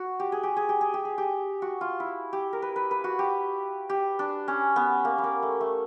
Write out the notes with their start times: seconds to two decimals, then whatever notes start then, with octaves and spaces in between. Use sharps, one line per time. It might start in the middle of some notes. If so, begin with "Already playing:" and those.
Already playing: F#4
0.20 G4
0.32 G#4
0.43 G4
0.57 G#4
0.69 G4
0.81 G#4
0.94 G4
1.05 G#4
1.18 G4
1.62 F#4
1.81 F4
2.00 E4
2.33 G4
2.53 A#4
2.62 B4
2.76 B4
2.91 B4
3.04 F#4
3.19 G4
3.89 G4
4.19 D4
4.48 C#4
4.76 B3
5.05 A#3
5.18 B3
5.24 A#3
5.43 A3
5.61 A3